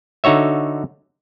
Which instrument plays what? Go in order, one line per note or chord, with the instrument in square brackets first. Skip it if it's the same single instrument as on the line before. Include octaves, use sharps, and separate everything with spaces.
[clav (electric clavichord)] D3 D#4 F#4 C#5 E5